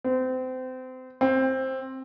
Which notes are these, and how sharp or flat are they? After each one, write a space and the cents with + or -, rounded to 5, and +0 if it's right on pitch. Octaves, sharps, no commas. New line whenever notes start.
C4 -30
C4 +10